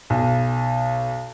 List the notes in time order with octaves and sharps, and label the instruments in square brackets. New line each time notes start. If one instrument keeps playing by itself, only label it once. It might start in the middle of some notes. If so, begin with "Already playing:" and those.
[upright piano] B1